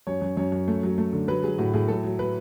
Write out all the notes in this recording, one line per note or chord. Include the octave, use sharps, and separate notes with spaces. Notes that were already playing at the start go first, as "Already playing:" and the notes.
F#2 C#5
F#2
F#2 C#5
F#2
A3
F#3
A3
D3
F#3 B4
F#3 G#4
A2 F#4
A2 G#4
F#3 A4
F#3
F#3 B4